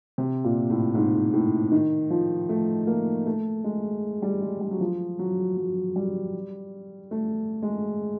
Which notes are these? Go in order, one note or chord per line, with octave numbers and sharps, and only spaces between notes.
C3
A#2
A2
G#2
A2
D#3
F3
A3
A#3
A3
G#3
G3
G#3
G3
F#3
F3
F#3
F#3
G3
A3
G#3